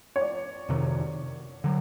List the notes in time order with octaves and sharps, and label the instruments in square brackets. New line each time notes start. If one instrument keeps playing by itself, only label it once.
[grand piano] C#5
D5
[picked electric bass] F2 C3 D#3
D3 F#3